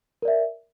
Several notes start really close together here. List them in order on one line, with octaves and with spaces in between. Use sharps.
A#4 D5 E5